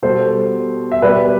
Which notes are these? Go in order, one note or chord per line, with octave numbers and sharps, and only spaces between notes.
B2 G3 A4 C5
E5
B2 G3 B4 D5